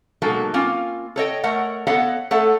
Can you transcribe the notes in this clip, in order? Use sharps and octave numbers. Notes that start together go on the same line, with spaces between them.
B2 F#3 G#3 A#3 D#4 A4
A#3 C4 C#4 F4 F5 G#5
A4 C#5 D#5 G5
A3 A#4 C#5 F#5
B3 A4 C#5 D#5 F5 F#5
A3 A4 C#5 F#5